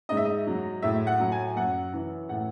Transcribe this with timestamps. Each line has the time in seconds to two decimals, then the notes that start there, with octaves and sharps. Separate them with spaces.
0.09 G#2 D#5
0.17 E5
0.25 D#5
0.47 F#3
0.82 A2 E5
1.07 F#5
1.20 F#3
1.32 G#5
1.56 F#2 F#5
1.93 E3
2.29 A2 F#5